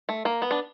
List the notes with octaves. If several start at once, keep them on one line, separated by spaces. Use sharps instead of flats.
A3
A#3
B3
D4